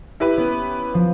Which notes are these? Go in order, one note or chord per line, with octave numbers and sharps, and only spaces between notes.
E4 G4 B4
B3 C#4
F3